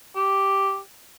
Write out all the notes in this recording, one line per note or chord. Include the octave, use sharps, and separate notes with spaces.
G4